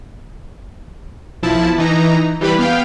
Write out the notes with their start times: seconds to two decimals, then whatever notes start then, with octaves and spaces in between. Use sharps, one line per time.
1.43 B1 F3 E4 A5
1.78 E3 D#4 A#5
2.41 E3 G3 G4 B4 B5
2.59 B3 F5 G5